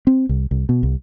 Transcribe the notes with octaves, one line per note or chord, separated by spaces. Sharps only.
C4
C2
C2
B2
C2